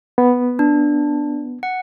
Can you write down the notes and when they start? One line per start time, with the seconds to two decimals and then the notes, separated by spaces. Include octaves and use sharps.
0.18 B3
0.59 D4
1.63 F#5